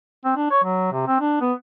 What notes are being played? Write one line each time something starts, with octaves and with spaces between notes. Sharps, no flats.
C4
D4
C#5
F#3
C3
C4
D4
B3